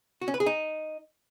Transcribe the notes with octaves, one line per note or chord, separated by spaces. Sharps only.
F#4
C#4
B4
G#4
D#4